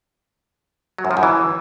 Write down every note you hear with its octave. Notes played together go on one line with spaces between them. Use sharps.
F#3
F#2
F3
F#2
E3